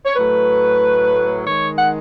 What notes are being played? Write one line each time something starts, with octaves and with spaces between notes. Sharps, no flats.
C#5
A2 F#3 A3 B4
D#3 G#3 C#5
F#5